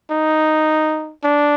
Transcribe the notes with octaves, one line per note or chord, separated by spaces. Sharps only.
D#4
D4